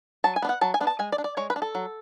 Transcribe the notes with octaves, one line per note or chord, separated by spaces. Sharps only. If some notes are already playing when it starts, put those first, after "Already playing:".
F#3 A5
G#5
B3 D4
F#5
F#3 A5
G#5
B3 D4
A5
G#3 G#5
D5
D4
D5
G#3 C#5
B4
D4
A4
F#3